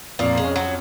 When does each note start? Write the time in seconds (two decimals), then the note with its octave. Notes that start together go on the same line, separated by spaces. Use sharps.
0.19 F2 A#2 A#3
0.37 G#3
0.44 C#4
0.56 F#3